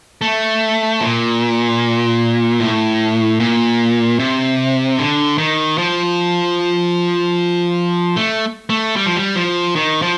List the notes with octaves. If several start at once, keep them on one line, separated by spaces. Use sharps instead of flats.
A3
A#2
A2
A#2
C3
D3
D#3
F3
A3
A3
G3
F3
G3
F3
D#3
F3